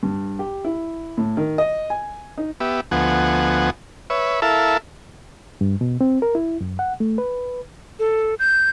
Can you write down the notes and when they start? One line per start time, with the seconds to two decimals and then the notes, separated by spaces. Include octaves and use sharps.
0.03 G2
0.39 G4
0.65 E4
1.17 A2
1.37 D#3
1.58 D#5
1.90 G#5
2.38 D#4
2.60 B3 G4 E5
2.91 D2 F3 B3 F#5 G#5
4.10 B4 C#5 E5
4.42 E4 A4 A#4 E5 F5 A5
5.61 G2
5.81 B2
6.01 C4
6.22 A#4
6.35 E4
6.61 F#2
6.79 F#5
7.00 A3
7.18 B4
7.99 A4
8.39 G6